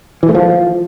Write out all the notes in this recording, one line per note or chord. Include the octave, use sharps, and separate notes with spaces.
E3
A3
F3